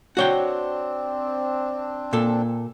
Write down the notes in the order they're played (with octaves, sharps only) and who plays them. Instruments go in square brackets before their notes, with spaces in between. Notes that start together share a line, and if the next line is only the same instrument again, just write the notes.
[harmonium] C4 D4 [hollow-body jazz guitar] F#4 C#5 G5
[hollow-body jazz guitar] A#2 A4